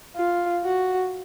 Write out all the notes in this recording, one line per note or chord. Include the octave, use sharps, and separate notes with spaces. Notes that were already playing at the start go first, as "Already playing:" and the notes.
F4
F#4